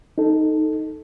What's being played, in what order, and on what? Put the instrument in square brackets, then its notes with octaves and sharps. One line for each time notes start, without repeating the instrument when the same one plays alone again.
[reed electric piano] D#4 A4